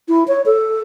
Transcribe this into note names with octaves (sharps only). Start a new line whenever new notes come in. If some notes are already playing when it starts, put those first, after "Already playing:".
E4
C#5
A4